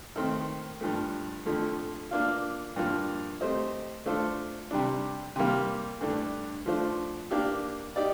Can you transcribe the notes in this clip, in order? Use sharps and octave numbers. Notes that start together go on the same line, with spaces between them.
D#3 A3 C4
G2 F3 A3
F2 D3 F3 A3
A#3 D4 F4
G2 F3 A#3
A3 C4 G4 C5 D#5
A3 D4 F4 A4 C5
C3 G3 D4
C3 G3 A#3
G2 D3 A3 D4
F3 A3 D4 F4 C5
A#3 D4 G4
D#4 G4 D5